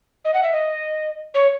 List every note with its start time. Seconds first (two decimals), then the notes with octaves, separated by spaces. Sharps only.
0.25 D#5
0.34 F#5
0.43 E5
0.53 D#5
1.34 C#5